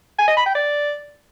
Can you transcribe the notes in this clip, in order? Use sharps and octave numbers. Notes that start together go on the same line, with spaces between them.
G#5
D#5
B5
G5
D5